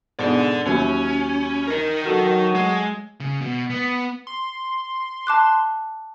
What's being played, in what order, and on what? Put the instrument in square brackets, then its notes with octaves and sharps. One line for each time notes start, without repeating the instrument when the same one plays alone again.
[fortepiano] G#2 B2 [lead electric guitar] A4 D5
[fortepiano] D#2 F#3 E4 [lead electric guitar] C#4
[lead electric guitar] D#4 A#4
[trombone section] F#3 F#4 [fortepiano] A4
[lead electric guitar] G#3
C#3
B2
B3
[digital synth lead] C6
[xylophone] A5 D6 F#6